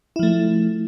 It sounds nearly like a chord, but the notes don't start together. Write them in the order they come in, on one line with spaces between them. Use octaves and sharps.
E4 F3 A3